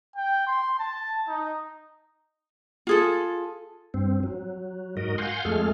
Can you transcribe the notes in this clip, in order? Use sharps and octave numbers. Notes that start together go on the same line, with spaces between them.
G5
C6
A5
D#4
F4 G#4 A4
G2 C4
F#3
G#2 F#4 A#4 D#5
F5 F#5 G#5 C6 G6
F2 G#3 A3 G#4 A4 F6